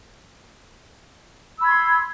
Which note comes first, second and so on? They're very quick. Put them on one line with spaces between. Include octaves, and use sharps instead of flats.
E6 B5 G#6 C6